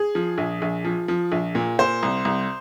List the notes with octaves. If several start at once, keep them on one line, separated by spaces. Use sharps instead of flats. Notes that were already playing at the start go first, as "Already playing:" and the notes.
Already playing: G#4
F3
A#1
A#1
F3
F3
A#1
A#2
A#2 C5
C2
C2